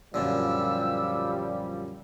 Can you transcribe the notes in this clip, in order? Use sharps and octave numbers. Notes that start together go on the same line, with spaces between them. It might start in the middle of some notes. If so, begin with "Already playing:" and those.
F#2 A#2 D3 F3 G3 E6